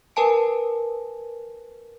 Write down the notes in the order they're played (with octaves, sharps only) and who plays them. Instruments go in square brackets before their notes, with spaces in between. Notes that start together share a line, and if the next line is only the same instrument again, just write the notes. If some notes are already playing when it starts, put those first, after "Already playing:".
[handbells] A#4 B4 G#5 A5 D7